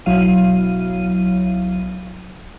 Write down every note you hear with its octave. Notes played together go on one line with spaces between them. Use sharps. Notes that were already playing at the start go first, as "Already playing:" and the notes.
B1 F#3 E4 F5 D#7